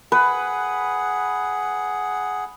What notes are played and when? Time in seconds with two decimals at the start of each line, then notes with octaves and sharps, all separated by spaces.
0.12 G#4 B4 F#5